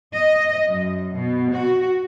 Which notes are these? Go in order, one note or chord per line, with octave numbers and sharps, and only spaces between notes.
D#5
F#2
B2
F#4